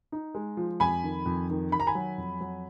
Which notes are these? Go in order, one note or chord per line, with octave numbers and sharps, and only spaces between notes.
D#4
G#3
F3
F2 G#5 B5
D#3
F2
D#3
D#3 B5
A#5
G#5 B5
F#3
F2
F#3